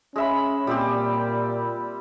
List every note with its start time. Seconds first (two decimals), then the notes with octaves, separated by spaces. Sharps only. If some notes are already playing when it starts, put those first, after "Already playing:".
0.16 G#3 C#4 E5 B5
0.67 A#2 G3 C4 G4